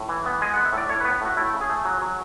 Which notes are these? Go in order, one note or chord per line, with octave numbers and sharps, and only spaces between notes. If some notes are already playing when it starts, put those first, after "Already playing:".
Already playing: A2
E3
B3
G#3 G#5
B3 F#5
E5
A2
D5
A2 C#5
B3 B4
A2 F#4
A3 E4
C#3
G#4
A3
F#3
F#3